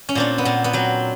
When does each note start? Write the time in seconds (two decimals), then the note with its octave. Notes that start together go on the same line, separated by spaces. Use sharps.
0.09 C#4
0.15 A#2 C4 D4
0.38 B3
0.45 A#2 C4
0.64 B3
0.73 F#3 C4